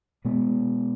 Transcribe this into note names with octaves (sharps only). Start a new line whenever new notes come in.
B2 G#3 B3